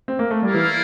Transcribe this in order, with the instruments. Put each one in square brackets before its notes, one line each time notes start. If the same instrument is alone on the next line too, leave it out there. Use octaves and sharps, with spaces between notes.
[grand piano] C4
A#3
A3
[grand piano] G3 [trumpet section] A#3 E4 A#4 D5 F5
[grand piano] E3